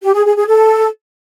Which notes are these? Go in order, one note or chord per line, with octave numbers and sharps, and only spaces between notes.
G4
G#4
G#4
G#4
A4